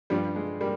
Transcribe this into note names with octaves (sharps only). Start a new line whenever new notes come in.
G2 F3 G3
G#3
G3 A#3